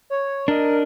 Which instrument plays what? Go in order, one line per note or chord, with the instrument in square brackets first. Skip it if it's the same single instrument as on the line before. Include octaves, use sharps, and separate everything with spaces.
[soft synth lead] C#5
[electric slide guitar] D4 D#5 [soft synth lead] A#4